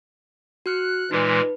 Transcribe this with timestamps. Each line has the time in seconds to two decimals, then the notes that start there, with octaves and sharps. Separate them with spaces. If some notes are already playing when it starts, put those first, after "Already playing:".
0.66 F#4 F6 F#6 C#7
1.11 A#2 E3 G#3 D#4 B4